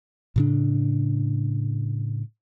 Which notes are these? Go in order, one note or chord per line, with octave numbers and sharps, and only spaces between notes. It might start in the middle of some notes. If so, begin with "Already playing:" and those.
A2 C#3 D4